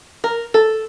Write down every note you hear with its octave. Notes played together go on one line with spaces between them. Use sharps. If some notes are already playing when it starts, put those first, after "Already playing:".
A#4
A4